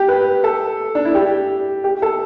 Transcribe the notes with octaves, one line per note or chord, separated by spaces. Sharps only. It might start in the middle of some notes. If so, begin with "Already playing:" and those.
Already playing: G4
B4
A4
D4
E4
G4
G4
A4